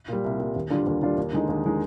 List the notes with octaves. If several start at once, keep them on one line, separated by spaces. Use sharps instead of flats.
A#2 G3
C2
A#2 G3
D#2
D3 G3 D4 F4
D#2
D3 G3 D4 F4
D#2
D3 G#3 D#4
D#2
D3 G#3 D#4